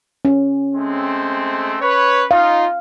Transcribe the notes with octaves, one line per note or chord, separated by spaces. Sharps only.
C#4
G#3 A3 C4
B4 C#5
D#4 F4 F5